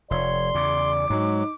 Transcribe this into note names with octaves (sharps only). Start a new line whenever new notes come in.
F1 C#5 D5 C6
E2 C#3 D6
G#2 F#3 G#3 D#4